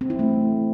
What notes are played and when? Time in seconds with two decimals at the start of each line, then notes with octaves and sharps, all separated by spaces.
0.01 C4
0.10 E4
0.19 A3